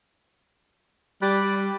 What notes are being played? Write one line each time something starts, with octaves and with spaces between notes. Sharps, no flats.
G3 D5 B5 F#6